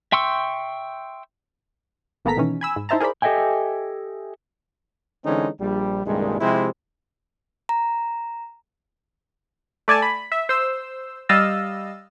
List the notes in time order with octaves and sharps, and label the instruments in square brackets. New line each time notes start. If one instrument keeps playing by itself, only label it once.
[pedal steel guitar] E5 G5 C6 C#6 E6
[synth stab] G#1 A#3 B3 A4 A#5 B6
B2 D#3 E3 C#4
G#5 B5 E6
G#2
D#4 E4 C5 E5 A5 A#5
G#4 A#4 C5 D5 B5
[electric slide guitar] G4 A4 D#5 E5 G5 G#5
[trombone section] D3 E3 G#3 C4 C#4 D#4
A#1 G3
C2 G2 A#2 D#3 G#3
C3 F3 G#3 E4 G4 C5
[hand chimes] A#5
[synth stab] A3 D5 G#5 A5
B5
E5
C5 E6
G3 D#5 F5 E6 A6